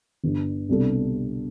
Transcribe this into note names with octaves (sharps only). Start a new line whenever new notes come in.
G1 G2 D3
C2 B2 G3 D4 A4